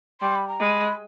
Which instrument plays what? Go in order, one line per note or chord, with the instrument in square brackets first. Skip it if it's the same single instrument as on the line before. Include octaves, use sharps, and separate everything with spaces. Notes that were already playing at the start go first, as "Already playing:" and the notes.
[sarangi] G3 [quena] C6
[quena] B5
A#5
[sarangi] G#3 [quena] B5